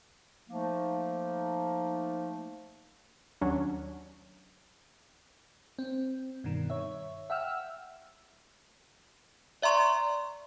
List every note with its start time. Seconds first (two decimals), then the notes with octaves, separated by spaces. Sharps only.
0.49 F3 A3 A#3 D#4
3.41 D#2 F#3 C#4 D4
5.79 C4
6.44 G2 B2 D#3
6.70 C#5 E5
7.30 E5 F#5 G5 E6 F6
9.62 D5 E5 A#5 C6 C#6